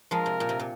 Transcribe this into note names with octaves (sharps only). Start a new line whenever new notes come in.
F3 G#3 A#4
C3
A#2
C3
A#2